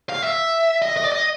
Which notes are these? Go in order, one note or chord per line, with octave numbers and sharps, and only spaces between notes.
F5
E5
D#5
D#5
D5
D#5